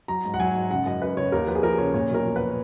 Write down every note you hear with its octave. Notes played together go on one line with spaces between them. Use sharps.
F#3 A#5
G#2
F#5
F#3 G#5
G#2
C#3 F#5
F#2 D#5
F#2 B4
C#3 C#5
D#2 A#4
F3 B4
G#4
F3 A#4
C#3 C#5
A#2 C#5
B1
A#4
F3
B4